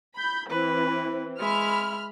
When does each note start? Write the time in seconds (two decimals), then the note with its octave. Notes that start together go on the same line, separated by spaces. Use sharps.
0.15 B5 G6
0.50 E3 C4 B4
1.39 G#3 E5 B5 F6